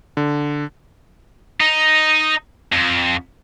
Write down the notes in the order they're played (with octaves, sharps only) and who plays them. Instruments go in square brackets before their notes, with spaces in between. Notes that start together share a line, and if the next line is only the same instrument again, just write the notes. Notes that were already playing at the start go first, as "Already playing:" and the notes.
[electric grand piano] D3
[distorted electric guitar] D#4
F2